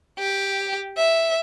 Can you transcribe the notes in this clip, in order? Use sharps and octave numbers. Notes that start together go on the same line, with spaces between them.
G4
E5